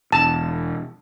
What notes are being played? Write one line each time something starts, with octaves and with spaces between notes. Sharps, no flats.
E1 A5